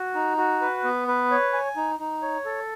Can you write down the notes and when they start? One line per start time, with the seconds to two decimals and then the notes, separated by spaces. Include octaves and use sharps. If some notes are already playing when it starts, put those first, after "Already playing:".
Already playing: F#4
0.15 D#4
0.37 F#4
0.61 B4
0.84 B3
1.08 B4
1.31 C#5
1.53 G#5
1.76 D#4
1.99 D#4
2.22 C#5
2.45 A4